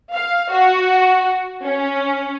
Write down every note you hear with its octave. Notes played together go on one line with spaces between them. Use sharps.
F5
F#4
C#4